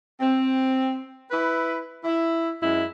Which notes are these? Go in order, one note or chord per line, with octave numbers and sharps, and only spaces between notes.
C4
E4 B4
E4
F#2 G#3 E4